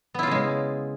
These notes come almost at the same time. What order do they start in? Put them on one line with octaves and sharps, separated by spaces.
B3 E4 F4 C#3 G#3